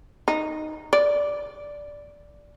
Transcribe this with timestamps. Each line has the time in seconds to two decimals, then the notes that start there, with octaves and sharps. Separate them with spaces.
0.28 D#4
0.93 D5